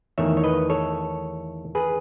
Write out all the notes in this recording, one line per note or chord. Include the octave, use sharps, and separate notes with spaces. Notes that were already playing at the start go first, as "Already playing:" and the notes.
E2 D#3 A3 D#4 C#5 E5
C#5
B4 D#5
A4 C#5
G#4 B4